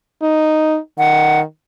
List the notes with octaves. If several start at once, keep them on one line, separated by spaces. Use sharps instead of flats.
D#4
D#3 F#5